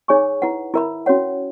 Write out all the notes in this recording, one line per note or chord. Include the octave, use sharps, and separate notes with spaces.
D#4 G#4 C#5 G#5 C#6
E4 B4 F#5
E4 A#4 E5 B5
C#4 F#4 C#5 F#5